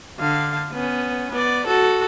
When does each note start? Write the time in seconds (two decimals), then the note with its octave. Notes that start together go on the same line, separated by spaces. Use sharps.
0.19 D3 F5
0.72 B3 C#4
1.31 B3 D5
1.67 F#4 A4